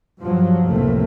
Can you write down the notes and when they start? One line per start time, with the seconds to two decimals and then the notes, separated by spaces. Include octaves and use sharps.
0.20 G2 F3 F#3
0.66 F1 C#2 A2 A3 A#3 C4